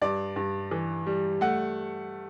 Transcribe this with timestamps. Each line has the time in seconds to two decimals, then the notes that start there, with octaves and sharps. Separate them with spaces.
0.02 G2 D5
0.36 G2
0.71 E3
1.07 G3
1.41 A3 F#5